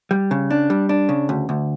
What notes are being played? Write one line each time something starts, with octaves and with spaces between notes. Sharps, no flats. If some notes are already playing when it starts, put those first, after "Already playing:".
G3
C#3
D4
G3
D4
C#3
D2
D2